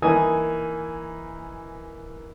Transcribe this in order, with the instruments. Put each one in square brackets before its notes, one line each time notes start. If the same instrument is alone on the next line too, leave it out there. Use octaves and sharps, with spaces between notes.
[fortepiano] E3 A#3 D#4 G#5 D#6